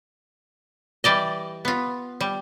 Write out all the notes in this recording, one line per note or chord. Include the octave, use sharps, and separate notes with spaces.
E3 G3 D5 D#5
B3 F4
G3